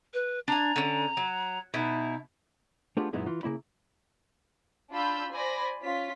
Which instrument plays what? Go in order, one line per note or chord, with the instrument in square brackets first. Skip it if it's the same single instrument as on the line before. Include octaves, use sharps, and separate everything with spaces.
[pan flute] B4
[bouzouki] D4 G#5 [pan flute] A#5
[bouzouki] D3 C#4
F#3
[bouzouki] B2 E4 [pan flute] D#4
[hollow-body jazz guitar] A3 B3 D4 F4 G4 G#4
F#2 A#2 G#3 B3 D#4 E4
E3 F4
C#3 A#3 E4 B5
[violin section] D4 F4 B5 E6 G6
C5 D5 G#5 B5 A#6
C#4 F4 B6